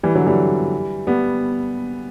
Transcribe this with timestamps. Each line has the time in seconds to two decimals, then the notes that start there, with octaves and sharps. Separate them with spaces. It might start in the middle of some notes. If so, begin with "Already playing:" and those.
0.03 E3 G3
0.15 D3 F#3
0.26 E3 G3
1.07 G3 B3